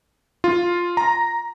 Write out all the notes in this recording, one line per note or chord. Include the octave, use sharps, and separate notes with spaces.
F4
A#5